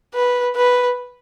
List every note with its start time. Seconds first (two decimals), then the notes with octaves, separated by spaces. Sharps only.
0.14 B4
0.56 B4